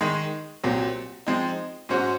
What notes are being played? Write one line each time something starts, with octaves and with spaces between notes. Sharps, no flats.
D#3 G#3 D#4
C2 A#2 F#3 C4
F3 G#3 C4 D#4
G#2 F#3 C#4 F#4 C5